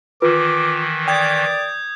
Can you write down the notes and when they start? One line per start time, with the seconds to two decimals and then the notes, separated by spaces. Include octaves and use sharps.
0.22 D#3 E3 F4 B4 D6
1.08 D5 G5 D#6 G6 G#6